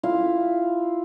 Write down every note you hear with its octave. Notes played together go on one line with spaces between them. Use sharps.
E4 F4 F5